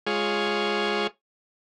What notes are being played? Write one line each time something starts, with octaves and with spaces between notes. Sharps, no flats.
G#3 F4 G#4 C#5